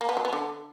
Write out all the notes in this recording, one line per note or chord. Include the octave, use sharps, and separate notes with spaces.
A#3
B3
F#3
B3
D3